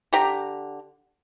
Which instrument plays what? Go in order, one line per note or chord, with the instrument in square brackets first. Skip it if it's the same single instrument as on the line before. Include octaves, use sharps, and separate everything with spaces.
[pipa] D3 G4 A#5